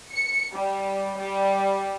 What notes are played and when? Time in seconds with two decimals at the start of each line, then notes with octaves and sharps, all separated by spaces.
0.13 C#7
0.55 G3
1.20 G3